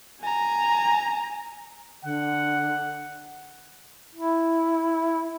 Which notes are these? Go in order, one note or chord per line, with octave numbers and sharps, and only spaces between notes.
G#5 A#5
D3 F#5
E4